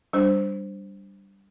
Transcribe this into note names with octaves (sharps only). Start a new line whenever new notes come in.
G3 D4 C5